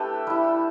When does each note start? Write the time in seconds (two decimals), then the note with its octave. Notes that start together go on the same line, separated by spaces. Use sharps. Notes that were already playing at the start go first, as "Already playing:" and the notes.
Already playing: A3 D4 G4 A4 B4
0.27 G3 E4